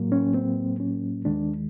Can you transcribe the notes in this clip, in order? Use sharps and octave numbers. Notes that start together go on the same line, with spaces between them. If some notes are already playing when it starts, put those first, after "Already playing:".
Already playing: A2 F#3 A#3
C#4
C4
C#4
D#2 D#3 G#3 D4